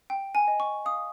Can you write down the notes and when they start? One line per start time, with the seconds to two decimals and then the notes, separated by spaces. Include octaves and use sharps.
0.10 G5
0.35 G#5
0.48 D#5
0.60 C#6
0.85 F5 D#6